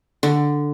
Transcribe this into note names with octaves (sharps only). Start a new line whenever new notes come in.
D3